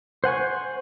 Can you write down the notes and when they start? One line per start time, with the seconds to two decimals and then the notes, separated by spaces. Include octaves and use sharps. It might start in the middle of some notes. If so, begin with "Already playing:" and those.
0.24 C5 F#5 G#5 C#6